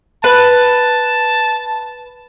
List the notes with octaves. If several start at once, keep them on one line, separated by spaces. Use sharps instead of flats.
B4 A5